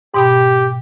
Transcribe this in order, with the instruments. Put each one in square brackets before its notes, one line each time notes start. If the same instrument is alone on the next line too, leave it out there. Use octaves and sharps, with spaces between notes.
[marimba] G#2 B2 B5 [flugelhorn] G4